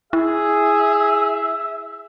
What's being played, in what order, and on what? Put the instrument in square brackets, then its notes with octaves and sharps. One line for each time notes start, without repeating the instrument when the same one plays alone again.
[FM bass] E4 [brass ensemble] G#4 [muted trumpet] E5